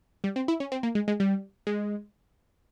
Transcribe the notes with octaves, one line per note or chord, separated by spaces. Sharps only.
G3
C4
E4
C#4
C4
A#3
G#3
G#3
G3
G#3